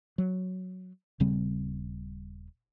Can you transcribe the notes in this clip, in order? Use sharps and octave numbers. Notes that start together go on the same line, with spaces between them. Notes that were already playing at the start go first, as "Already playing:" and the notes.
F#3
D#1 C#3 G3 C4